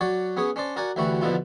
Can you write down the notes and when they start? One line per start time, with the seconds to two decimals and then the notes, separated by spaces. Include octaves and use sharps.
0.01 F#3 F#4 C#5 D5
0.37 B3 C#4 G#4 C#5
0.56 C#4 D4 C5 D5
0.76 F#4 A#4 D5 F#5 G#5
0.96 D2 E3 G3 E4 F#4 C#6
1.21 F2 B2 D3 B3 E4 F4